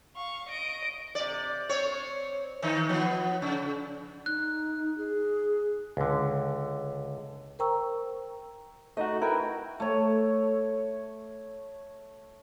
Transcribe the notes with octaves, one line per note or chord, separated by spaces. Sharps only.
F5 C#6
D#5 D7
C3 D5
C4 C#5
D#3 D#4
F3 B3
C#3
D#4 F#6
G#4
C#2 D3
A#4 C5 G5 A#5 C#6 E6
A3 D#4 F#4 D#5
E4 A#4 B4 G5
A3 C#5